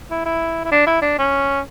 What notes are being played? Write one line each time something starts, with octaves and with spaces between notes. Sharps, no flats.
E4
E4
E4
D4
E4
D4
C#4